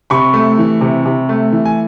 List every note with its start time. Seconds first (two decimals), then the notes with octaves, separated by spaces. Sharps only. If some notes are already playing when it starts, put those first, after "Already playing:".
0.10 C3 B5 C#6
0.34 A3
0.58 E3
0.81 C3
1.06 C3
1.29 A3
1.52 E3
1.65 G#5